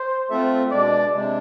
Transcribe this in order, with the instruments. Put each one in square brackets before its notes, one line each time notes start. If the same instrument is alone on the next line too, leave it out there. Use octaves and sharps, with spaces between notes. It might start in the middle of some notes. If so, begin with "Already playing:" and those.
Already playing: [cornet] C5
[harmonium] A3 C4 F4 A4 E5
[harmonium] B2 G#3 D4 [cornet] D5
[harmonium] C3 G#3 D4